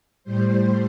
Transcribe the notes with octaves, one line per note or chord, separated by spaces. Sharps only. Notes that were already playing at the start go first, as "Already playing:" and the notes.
A2 G3 C5